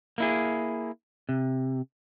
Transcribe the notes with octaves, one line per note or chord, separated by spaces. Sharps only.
A#3 E4 G#4
C3